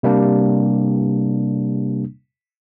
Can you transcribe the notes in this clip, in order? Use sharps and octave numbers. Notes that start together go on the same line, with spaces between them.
C3 G3 A#3 D4